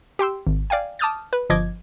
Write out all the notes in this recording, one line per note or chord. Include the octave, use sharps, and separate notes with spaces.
G4 G5 C6 E6
G#1
D5 F5 G5 G#5
A5 D6 D#6 F6 G6 A6
B4
G1 F3 D#5 D6 G#6